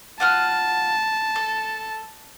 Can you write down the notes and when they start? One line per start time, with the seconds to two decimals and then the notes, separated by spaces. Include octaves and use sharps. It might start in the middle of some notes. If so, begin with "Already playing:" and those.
0.20 F4 F#5 A5 F6
1.36 A4